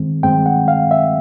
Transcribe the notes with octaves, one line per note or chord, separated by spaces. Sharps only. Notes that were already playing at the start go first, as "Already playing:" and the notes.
Already playing: G2 D#3 G#3 C4
G2 D#3 G#3 C4 G5
F#5
F5
E5